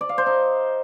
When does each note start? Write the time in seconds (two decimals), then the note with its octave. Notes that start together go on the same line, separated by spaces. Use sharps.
0.01 D5
0.09 F5
0.18 C5
0.26 D#4